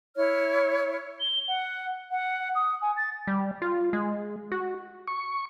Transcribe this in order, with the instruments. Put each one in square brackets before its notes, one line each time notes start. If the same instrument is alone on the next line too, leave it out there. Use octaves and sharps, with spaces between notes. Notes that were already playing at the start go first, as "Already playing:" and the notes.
[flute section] E4 C#5 F6
[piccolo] G7
F#5
F#5
D#6
G#5
A6
[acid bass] G3
F4
G#3
F#4
[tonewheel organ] C#6